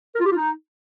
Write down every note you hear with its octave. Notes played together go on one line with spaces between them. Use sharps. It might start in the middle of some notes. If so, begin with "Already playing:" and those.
A#4
F4
G4
F4
D#4